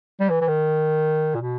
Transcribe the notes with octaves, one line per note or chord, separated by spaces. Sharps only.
G3
E3
E3
D#3
A#2
B2